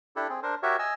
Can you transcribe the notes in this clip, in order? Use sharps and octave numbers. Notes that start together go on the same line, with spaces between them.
D4 E4 G4 A4
C4 G#4
D4 A#4 C5
F#4 G4 A#4 C#5 E5
D#5 G#5 E6